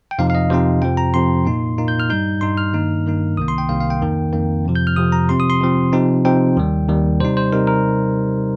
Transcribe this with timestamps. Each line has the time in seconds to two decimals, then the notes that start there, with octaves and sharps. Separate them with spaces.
0.11 G5
0.19 F2 C3 F3 C4 D#4 F5
0.30 F5
0.35 D#5
0.50 F2 C3 F3 C4 D#4 C5
0.82 F2 C3 F3 G5
0.97 A#5
1.14 F2 C3 F3 C6
1.45 A#2 A#3 D#4
1.78 A#2 A#3 D#4
1.88 G6
2.00 F6
2.10 G2 G3 D#4 G6
2.41 G2 G3 D#4 C6
2.57 F6
2.73 G2 D#3 A#3 D#4
3.06 G2 D#3 A#3 D#4
3.37 C2 C3 D#3 A#3 D#6
3.48 C6
3.58 G5
3.69 C2 C3 D#3 A#3 F5
3.80 F5
3.90 G5
4.02 F2 D#3 A#3
4.33 F2 D#3 A#3
4.65 F2 C3 F3
4.75 G6
4.87 F6
4.96 F2 C3 F3 D#6
5.12 A#5
5.29 C3 F3 C4 C6
5.40 D#6
5.50 C6
5.61 C3 F3 C4
5.92 C3 F3 C4 D#4
6.25 C3 F3 C4 D#4 G5
6.56 D#2 D#3 G3
6.88 D#2 D#3 G3
7.20 C3 G3 D#4 C5
7.37 C5
7.53 C3 G3 D#4 A#4
7.67 A#4